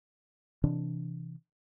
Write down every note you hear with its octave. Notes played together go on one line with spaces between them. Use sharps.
C3 E3 D4